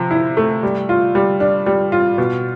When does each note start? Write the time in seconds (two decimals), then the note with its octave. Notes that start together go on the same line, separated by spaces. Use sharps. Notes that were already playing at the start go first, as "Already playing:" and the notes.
Already playing: C3 F3
0.11 E4
0.37 A3
0.63 G3
0.89 F4
1.15 G3
1.40 D4
1.66 G3
1.92 F4
2.18 B2